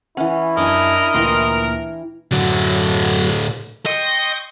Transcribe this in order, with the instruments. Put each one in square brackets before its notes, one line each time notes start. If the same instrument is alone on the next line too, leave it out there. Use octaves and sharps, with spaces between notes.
[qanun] E3 C#4 [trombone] E4 [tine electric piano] F#5
[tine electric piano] F#2 [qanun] D4 G#5 [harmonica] A#4 D#5
[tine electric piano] D2 A#2 A#3 [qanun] E3 G5 C6
[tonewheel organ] F#2 F#3 F#4 [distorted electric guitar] A2 D3
[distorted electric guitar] D#5 [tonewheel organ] G5 C6 C#6